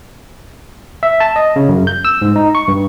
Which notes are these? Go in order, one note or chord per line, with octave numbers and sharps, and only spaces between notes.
E5
A5
D#5
C#3
F#2
G6
E6
G#2
D#4
C#6
G2